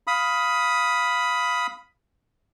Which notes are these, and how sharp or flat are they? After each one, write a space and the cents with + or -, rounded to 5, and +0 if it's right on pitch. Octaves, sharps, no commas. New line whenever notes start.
F5 +10 B5 +0 D#6 +15